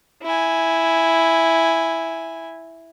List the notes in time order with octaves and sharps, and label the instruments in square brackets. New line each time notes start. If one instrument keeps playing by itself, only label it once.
[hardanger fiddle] E4 G#5